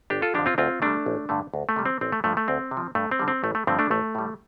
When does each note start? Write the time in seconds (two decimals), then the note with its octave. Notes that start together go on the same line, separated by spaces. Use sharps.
0.10 G1 D4 G4
0.22 F4 A4
0.34 F2 D3 F3 D4 G4
0.46 C4 F4
0.58 D2 C4 F4
0.82 C3 G3 A3 D4
1.06 A1
1.29 G2 D3 A3
1.54 D2
1.69 A3
1.76 C3 G3
1.86 C4
2.01 A1 C4
2.12 A3
2.24 G2 F3 A3
2.37 A3
2.48 D2 C4
2.71 C3
2.77 F3
2.95 G2 A3
3.11 C4
3.19 D3 G3
3.28 C4
3.43 A1 A3
3.55 A3
3.67 G2 D3 F3 A3 C4
3.79 A3 D4
3.90 A1 A3
4.15 A2 G3